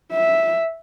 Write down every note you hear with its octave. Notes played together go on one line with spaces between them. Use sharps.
E5